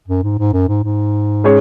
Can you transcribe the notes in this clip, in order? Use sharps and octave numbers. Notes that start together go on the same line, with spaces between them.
F#2
G#2
G#2
F#2
G#2
G#2
G#3 C#4 G#4 C#5